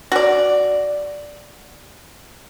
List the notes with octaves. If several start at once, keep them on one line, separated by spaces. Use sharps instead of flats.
F#4 D5